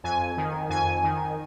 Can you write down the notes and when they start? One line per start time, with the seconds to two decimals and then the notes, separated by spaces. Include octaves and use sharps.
0.03 F2 G#5
0.37 D#3
0.69 F2 G#5
1.03 D#3